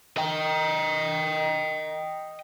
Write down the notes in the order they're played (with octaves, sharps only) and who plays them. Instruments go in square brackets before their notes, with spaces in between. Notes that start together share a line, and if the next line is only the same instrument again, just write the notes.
[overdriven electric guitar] D#5 G5